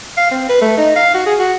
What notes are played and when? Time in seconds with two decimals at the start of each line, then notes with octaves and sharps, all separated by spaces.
0.17 F5
0.31 C4
0.49 B4
0.61 A3
0.78 D#4
0.96 F5
1.14 F#4
1.26 G#4
1.39 F#4